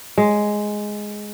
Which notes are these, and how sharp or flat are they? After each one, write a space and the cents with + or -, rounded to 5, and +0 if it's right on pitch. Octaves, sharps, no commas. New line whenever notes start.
G#3 +5